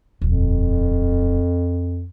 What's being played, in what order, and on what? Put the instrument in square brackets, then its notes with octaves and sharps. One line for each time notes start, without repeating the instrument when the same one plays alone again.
[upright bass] D#1 F3 [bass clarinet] F2